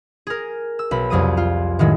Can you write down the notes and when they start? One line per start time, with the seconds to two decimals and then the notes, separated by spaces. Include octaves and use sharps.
0.27 G#4 A#4
0.79 E6
0.91 B1 B5
1.10 C2 F2 F#3 D#6 D#7
1.37 F4
1.79 A2 D#3 F#3 G#3